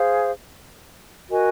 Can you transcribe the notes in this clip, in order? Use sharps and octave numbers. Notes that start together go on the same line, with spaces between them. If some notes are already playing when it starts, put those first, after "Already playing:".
Already playing: G#4 C5 F5
F#4 A#4 D#5 G#5